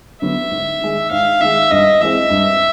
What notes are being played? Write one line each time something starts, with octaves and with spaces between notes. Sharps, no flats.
D3 F#3 B3 E5
G#2
D#3 G#3
G#2 F5
D#3 G#3 E5
G2 D#5
E3 G#3 C4 E5
G2